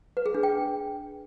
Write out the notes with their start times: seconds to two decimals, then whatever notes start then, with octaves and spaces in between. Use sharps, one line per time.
0.17 B4
0.26 G#4
0.34 D4
0.43 G5